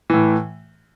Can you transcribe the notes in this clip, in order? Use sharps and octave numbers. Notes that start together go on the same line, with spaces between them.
A2 E3